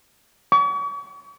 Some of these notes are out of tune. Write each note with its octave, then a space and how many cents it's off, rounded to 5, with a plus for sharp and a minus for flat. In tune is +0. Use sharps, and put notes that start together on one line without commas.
C#6 +40